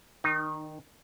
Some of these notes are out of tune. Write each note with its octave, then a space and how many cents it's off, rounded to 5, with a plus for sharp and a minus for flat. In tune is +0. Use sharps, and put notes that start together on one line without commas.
D#3 +0 D#4 -30